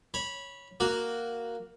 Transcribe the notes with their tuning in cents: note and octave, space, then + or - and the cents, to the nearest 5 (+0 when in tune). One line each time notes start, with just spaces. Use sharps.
C#5 +0 B5 -15
A#3 +0 F#4 +0